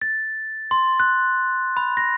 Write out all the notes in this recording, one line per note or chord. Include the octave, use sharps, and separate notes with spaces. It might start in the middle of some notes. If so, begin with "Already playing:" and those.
A6
C6
F#6
B5
A#6